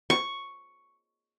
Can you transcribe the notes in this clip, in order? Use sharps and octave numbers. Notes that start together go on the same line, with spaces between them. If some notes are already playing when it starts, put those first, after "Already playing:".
C#6